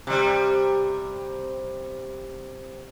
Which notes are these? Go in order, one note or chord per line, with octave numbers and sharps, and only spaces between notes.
C3 G3